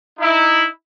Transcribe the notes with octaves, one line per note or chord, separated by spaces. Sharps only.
D#4 E4